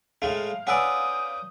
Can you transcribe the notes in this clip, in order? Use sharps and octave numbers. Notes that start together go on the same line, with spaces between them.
A2 G#3 A3 F5
C#4 B4 D5 F#5 G#5 D#6 E6 G6